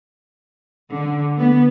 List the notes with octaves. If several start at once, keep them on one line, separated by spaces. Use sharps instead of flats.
D3
B3